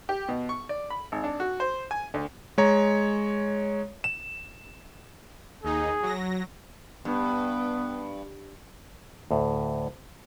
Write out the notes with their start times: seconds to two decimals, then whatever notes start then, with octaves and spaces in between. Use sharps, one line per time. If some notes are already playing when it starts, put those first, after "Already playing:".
0.09 G4
0.29 B2
0.49 C#6
0.69 D5
0.90 B5
1.12 G#1
1.24 D4
1.40 F#4
1.60 C5
1.91 G#5
2.14 D2
2.58 G#3 C#5 A#5
4.04 E7
5.64 D#2 D#4 G#4
6.02 F#3 A#6
7.05 G2 B3
9.31 D2 A2